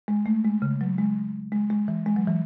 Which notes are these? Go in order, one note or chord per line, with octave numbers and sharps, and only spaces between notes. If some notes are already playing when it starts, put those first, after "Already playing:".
G#3
A3
G#3
C#3
F#3
G#3
G#3
G#3
E3
G#3
F#3
E3